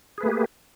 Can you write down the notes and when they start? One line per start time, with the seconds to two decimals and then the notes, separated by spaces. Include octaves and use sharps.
0.18 G#4
0.20 B4
0.23 A3
0.26 A#3
0.29 G4